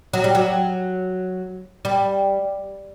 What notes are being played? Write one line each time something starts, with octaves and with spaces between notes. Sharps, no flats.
F#3
G3
F#3
G3